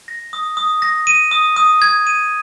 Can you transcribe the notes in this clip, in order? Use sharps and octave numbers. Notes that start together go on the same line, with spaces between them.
A#6
D#6
D#6
A#6
D#7
D#6
D#6
G#6
D#7